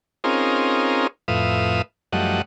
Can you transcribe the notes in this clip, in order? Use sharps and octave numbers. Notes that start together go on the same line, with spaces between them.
C4 C#4 D#4 F4 G#4 A#4
F2 A2 B4 E5 F5 D#6
F#2 F3 G3 A3 D#5 F#5